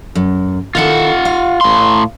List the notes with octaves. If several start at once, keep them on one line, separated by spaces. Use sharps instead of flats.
F#2
D#3 E4 F4 A4 F#5
F5
A2 C6